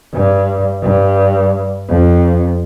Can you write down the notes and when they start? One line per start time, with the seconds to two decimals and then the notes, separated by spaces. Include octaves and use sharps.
0.14 G2
0.83 G2
1.89 F2